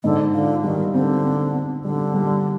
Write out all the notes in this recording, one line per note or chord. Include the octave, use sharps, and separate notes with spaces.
G#2 D3
D3 F4
D#3 G3
D3 C4
C4
C4
D3 G3
G3